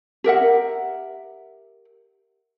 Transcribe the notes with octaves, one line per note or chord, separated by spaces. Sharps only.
G4 A#4 E5 F#5